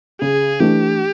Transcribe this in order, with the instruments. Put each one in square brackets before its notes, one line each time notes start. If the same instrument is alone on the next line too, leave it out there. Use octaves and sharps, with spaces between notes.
[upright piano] C#3 [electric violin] G#4
[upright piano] E3 A3 D4 [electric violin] G4